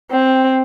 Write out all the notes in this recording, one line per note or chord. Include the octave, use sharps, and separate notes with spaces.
C4